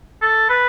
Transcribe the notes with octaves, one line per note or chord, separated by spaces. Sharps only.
A4
B4